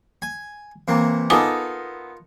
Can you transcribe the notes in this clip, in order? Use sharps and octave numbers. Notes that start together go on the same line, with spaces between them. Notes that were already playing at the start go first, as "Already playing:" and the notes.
G#5
C3 E3 A#3
B3 D#4 F4 A4 A#4 G#5 D6 D#6